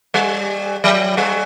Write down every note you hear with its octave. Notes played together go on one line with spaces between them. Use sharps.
G3
F#3
G3